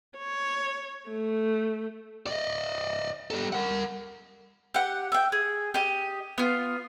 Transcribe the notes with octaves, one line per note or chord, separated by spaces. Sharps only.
C#5
A3
D5 D#5
G3 A4
A#4 F#5
G4 F#5
E5 G5
G#4
G4 D#5
B3 F4